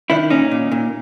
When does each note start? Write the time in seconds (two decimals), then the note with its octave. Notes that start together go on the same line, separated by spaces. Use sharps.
0.10 D#3 D4 E4
0.30 A#2 C#4 D#4
0.51 A#2
0.72 A#2